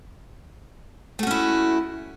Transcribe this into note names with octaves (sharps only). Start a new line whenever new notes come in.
A3 C#4 E4 F#4